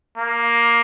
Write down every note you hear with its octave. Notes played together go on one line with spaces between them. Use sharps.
A#3